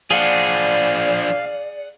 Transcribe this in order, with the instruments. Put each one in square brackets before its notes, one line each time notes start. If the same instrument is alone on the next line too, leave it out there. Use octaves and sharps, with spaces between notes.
[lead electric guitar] F3 D4 [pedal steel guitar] G#4 F#5 [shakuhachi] D5 [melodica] F5